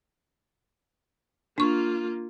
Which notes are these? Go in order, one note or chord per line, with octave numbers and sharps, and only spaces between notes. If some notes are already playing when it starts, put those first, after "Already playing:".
A#3 D4 F4 C#6